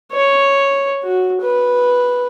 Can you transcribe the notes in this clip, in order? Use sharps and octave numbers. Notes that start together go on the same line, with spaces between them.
C#5
F#4
B4